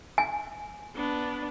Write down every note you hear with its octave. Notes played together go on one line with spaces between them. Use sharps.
G#5
B3 D4